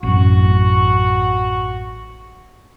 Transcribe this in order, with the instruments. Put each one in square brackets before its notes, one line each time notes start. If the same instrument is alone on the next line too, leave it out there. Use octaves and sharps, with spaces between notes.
[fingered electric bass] A1 F#2 [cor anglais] F#4